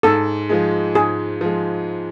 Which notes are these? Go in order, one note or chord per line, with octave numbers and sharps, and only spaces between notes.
G#2 A4
F3 G#3
G#2 G#4
F3 G#3